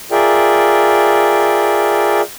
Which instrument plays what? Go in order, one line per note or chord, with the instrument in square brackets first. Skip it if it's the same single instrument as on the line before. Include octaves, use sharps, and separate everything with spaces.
[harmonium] F4 G#4 A#4 D5 E5 G5